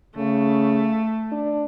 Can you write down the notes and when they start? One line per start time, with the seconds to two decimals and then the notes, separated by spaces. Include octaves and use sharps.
0.16 C#3 A3
1.32 D4